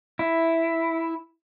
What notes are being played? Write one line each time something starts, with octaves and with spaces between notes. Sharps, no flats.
E4